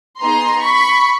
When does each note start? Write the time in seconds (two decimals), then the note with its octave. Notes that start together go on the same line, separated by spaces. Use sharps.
0.21 B3 D#4 G#4 A#5 C6
0.63 B5 C#6